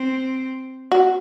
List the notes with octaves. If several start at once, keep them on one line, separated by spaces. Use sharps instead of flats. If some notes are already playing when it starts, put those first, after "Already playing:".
Already playing: C4
F#4